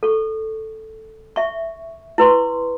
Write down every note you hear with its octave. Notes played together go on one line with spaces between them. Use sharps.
A4 C#6
E5 C#6
E4 B4 C6 C#6